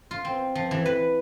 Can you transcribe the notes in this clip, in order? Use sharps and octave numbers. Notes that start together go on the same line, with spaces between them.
F4
C4
F3
E3
B4